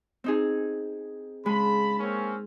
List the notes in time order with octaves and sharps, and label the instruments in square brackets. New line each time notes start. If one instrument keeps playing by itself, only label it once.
[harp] C4 D#4 G#4
[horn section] C#3 A5 B5 [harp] G#3
[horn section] A#3 C4 C#4